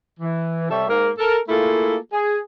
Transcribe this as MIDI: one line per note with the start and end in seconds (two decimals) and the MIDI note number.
0.19 0.66 52
0.70 0.87 48
0.70 0.87 55
0.70 0.87 69
0.70 0.87 73
0.70 0.87 76
0.88 1.10 44
0.88 1.10 58
0.88 1.10 70
1.18 1.38 69
1.18 1.38 70
1.49 1.96 57
1.49 1.96 58
1.49 1.96 64
1.49 1.96 65
1.49 1.96 68
1.49 1.96 69
2.13 2.39 68